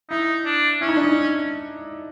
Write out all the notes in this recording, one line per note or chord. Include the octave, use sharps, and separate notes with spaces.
D#4 E4
D4
C#4 E4
D#4
D4
D#4